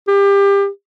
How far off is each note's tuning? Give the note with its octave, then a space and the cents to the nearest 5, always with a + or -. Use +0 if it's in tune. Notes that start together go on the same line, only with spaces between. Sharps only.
G4 +25